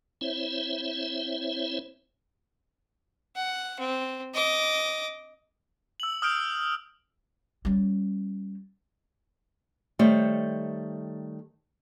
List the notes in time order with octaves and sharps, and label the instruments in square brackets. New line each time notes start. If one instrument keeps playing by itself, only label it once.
[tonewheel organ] C4 E4 C5 C#5 E5
[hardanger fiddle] F#5
C4
D#5 D6
[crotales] E6 F#7
D#6 F6 G6 D7
[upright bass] G3 C#4
[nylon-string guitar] D#3 G3 A3 C5 C#5